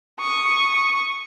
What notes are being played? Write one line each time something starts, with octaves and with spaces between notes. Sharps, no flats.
C#6 D#6